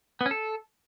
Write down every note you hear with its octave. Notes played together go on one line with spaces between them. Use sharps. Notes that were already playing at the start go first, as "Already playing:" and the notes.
B3
C#4
A4